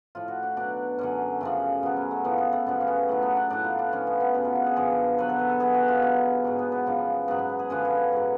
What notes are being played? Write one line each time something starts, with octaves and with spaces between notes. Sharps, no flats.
A2 F3 F4
F#4
D4
B2 F#3 D4
F#2 D3 F#3 C#4
F#2 C#3 F3 A3
B2 F#3 B3
C#4
A3
A2 F3 B3
B3
A3
F#2 C#3 F3 B3
C#4
B3
A2 F#3 A3
B3
D4
A2 F#3 D4
F4
D4
A2 F3 C#4
B3
B3
F#2 C#3 F#3 D4
F4
F#4
G#4
F#2 D3 F3 A4
B2 F#3 B4
A4
B4
A4
B2 F#3 G#4
F#4
F4
B2 F#3
G#2 F#3 D4
B3
B3
F#2 C#3 F3
G#2 F#3 B3
B3
B3
G#4
F#2 D3 F3 B4
C#5
G#2 F#3